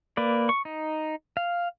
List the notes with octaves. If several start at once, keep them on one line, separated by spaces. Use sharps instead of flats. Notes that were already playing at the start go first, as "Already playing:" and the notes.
A#3 B4 D5
C#6
D#4
F5